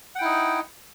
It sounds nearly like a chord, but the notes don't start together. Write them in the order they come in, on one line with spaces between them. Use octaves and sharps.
F#5 G5 E4 D#4